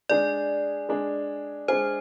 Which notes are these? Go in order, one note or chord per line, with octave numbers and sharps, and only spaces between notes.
G#3 D4 G#4 D5
G#3 D4 G#4
G#3 D4 G#4 C5